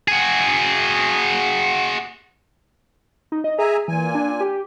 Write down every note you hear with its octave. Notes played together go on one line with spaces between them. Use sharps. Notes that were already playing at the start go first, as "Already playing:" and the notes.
F#4 G#4
D#4
D#5
G#4 E5 G#5 A#5
A#2 E3 G#5
D4
G4